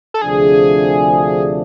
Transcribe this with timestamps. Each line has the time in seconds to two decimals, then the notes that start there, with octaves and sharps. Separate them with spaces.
0.14 A4
0.22 D2 C3 F3 A3 D4 G#4